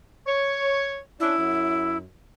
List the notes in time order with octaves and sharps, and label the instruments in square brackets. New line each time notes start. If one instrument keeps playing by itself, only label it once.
[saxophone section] C#5
[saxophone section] C#4 D4 [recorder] E4
[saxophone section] F#2